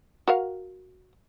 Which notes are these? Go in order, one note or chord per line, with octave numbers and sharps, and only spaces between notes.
F#4 A#4 F5